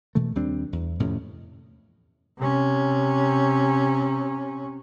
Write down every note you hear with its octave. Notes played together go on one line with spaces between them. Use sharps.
B2 E3 A3
D#2 G3 C4 D4
E2
F2 A2 C3 C#4
C3 C#4